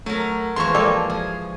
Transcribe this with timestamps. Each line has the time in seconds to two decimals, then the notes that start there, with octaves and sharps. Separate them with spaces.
0.06 F#3 A3 A#4
0.56 E3 F3 G#3 A#3 B3 C6 C#6
0.75 G#3 A#3 G4 A4 D5 G5 D6
1.10 F3 G#4